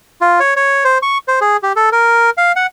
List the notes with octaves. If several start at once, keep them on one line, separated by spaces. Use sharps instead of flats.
F4
C#5
C#5
C5
C#6
C5
G#4
G4
A4
A#4
F5
F#5